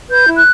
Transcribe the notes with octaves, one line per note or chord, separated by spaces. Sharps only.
B4 G6
E4
F#6